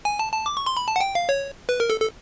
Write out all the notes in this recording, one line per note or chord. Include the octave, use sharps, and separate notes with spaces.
G#5
A5
A5
D6
C#6
C6
B5
A5
F#5
G5
F5
C#5
B4
A#4
A4
A4